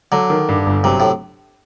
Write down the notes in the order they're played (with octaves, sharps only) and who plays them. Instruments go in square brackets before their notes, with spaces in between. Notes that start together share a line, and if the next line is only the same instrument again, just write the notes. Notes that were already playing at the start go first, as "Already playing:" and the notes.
[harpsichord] D3 [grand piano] F#3
[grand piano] D#3
G2
G1
[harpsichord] C3 [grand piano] F#3
[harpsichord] A2